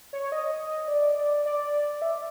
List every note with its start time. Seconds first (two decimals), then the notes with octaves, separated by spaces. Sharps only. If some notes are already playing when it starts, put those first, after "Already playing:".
0.13 C#5
0.32 D#5
0.88 D5
1.46 D5
2.02 E5